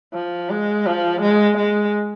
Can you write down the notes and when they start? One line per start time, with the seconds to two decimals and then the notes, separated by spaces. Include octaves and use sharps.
0.14 F3
0.50 G#3
0.86 F3
1.22 G#3
1.58 G#3